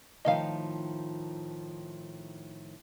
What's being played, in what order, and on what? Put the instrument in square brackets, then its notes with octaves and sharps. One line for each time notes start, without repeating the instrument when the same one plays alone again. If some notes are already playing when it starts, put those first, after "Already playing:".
[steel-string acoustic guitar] A2 D#3 F3 [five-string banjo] D#5 F5